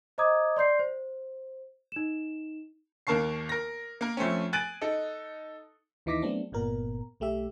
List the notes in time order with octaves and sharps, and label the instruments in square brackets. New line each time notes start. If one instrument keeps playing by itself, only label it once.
[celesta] C5 D#5 A#5 D6 D#6 G#6
D5 C6 G6 C7
C5
D#4 E7
[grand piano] D#2 A#3 A#4 A5 C#6 C7
A#4 A#6
A#3 A#4
F2 A3 C4 C#4
G#5 F#6 A6 D7 D#7 F#7
D#4 A4
[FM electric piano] D#2 E3 D#4 D6 A#6 B6
F#3 A3 B3 C4 D4
G1 A#2 B3 A#4
B1 A3 G4 E5